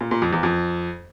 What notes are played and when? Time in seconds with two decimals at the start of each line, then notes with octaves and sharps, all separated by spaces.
0.01 A#2
0.11 A#2
0.22 F2
0.33 E2
0.43 F2